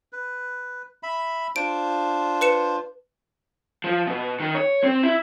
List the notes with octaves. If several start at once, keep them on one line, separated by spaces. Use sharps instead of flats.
B4
E5 B5
D4 F4 C5 D7
B4 C#7 E7
F3
B2
D#3
C#5
C4
E4